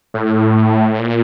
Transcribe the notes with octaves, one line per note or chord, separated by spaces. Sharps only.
A2
A#2